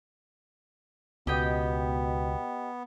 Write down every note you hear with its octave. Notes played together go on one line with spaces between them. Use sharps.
C#2 B2 B3 G4 D#5 G5